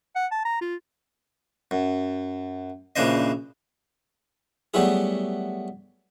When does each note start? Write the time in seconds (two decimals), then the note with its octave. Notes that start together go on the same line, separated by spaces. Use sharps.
0.16 F#5
0.32 A5
0.45 A#5
0.61 F4
1.71 F#2
2.96 A#1 C#3 E3 D4 C5 D#5
4.74 F#3 G3 A3 B3 E4 G#4